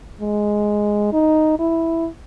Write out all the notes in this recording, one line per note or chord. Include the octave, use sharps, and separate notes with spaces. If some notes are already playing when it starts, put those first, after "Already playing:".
G#3
D#4
E4